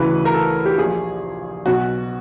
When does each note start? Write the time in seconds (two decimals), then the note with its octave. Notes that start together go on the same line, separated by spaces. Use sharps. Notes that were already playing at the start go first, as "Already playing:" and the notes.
Already playing: D2 C#3 E3 B4
0.25 A#4
0.34 A4
0.65 G4
0.78 A#1 A#2 G#4
1.66 B1 B2 F#4